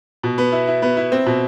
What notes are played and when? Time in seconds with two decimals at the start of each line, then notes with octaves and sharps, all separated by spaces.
0.23 B2
0.38 B3
0.52 E4
0.68 E4
0.82 B3
0.97 E4
1.12 C4
1.26 B2